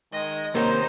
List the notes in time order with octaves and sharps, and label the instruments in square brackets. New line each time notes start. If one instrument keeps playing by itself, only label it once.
[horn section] D#3 G#3 [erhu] D#5
[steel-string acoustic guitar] C3 D#3 C#4 [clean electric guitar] A#3 A#4 [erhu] D#4 [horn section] C5